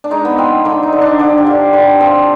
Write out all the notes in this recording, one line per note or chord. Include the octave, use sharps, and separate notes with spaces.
D4
G#3 D#4
B3
F3 C4
D3 D4
D#4
D3
D4
D3 D4
G4
D3 F4
D3
F3 C4